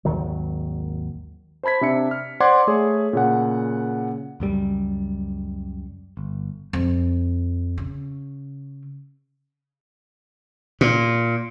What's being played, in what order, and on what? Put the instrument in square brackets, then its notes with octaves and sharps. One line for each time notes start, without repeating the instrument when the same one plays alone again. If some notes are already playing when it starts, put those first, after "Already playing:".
[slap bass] G#1 D#2 D#3 F#3
[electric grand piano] C5 A5 B5 G#6 B6
C3 D4 E5 C#7
F6
C5 D5 F#5 C6 D6 G#6
A3 G#4 C#5
A#2 C#3 F#5
[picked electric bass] C#2 F#2 G3
G1
[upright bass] F2
C#3
[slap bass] A#2